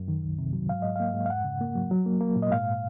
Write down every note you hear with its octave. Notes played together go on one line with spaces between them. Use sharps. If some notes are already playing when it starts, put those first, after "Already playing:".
Already playing: F#2
D#3
C2
C3
F#3
G#2 F5
G#2 D#5
A#3 F5
G#2
F5
F2 F#5
C#3
A#3
F#3
F#3
A#3
A#3
A#2
D#5
G#2 F5